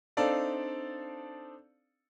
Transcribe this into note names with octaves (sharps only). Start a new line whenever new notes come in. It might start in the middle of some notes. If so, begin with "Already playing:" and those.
C4 D4 D#4 A4 D5 F5